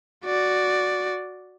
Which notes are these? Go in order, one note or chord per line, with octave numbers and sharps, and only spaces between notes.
F#4 D5